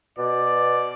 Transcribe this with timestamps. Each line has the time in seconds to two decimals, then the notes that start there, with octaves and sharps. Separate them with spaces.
0.18 B2 D5